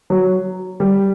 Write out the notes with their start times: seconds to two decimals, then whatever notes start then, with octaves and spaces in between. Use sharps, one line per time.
0.10 F#3
0.80 G3